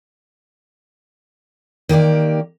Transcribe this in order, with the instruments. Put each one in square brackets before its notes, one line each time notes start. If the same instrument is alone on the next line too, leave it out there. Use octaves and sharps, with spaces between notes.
[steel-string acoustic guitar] D#3 A#3 G4 D5